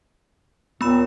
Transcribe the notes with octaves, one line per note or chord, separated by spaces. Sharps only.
D#2 A#2 D#3 B3 B5 E7